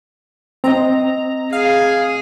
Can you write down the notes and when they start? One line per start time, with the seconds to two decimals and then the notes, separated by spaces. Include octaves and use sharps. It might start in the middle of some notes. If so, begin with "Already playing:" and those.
0.64 C4 D#5 A#5
1.53 G#4 F5